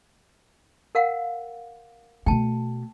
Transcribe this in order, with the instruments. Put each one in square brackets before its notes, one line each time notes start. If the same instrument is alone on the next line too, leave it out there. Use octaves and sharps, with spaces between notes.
[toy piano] A#4 F5 F#5
[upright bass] B2 A3 [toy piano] G5 A5